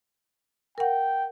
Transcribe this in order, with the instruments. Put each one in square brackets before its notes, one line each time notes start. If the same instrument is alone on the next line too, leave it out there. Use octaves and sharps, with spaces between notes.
[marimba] A#4 F#5 [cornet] G5